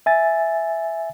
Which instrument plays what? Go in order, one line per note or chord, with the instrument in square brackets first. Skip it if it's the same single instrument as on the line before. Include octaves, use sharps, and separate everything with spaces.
[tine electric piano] E5 G#5 A6